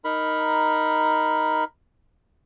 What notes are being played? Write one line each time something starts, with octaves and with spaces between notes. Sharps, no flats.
D#4 A#4 B5